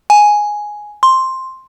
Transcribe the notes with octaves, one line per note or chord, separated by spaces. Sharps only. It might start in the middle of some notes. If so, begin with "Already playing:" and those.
G#5
C6